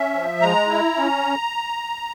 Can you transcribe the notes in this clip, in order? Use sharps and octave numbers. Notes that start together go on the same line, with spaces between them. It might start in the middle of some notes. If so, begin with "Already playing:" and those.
Already playing: C#4 E5
F3
G#3 A#5
E4
C#4